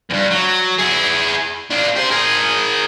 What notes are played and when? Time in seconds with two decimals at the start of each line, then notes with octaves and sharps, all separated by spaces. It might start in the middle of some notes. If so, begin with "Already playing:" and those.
0.10 E2 G2
0.31 F#3
0.78 E4 G#4
1.70 A#3 D4
1.96 G4 C5
2.11 G#4 A#4